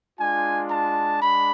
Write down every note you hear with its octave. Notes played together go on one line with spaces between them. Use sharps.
G#3 D4 F4 G#5
A5
G#3 D4 B5